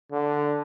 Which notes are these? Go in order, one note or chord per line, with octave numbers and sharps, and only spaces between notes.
D3